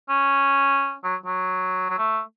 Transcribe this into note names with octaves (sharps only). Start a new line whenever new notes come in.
C#4
F#3
F#3
F#3
A3